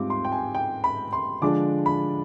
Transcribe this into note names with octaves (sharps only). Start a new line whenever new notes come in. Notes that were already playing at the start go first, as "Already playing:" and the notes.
Already playing: G#2 G3 C4 F4 D6
C6
G5
G#5
G5
B5
C6
D3 F3 G#3 D4 D6
B5